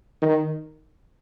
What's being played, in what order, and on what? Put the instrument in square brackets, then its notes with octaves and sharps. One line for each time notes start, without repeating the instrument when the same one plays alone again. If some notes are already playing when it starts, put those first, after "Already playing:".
[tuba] D#3